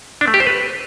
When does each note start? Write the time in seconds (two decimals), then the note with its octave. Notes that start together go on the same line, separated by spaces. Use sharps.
0.21 D4
0.28 A3
0.34 G4
0.40 C5
0.47 B4